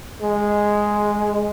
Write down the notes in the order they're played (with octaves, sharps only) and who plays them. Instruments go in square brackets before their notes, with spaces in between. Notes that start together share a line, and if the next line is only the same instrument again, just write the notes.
[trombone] G#3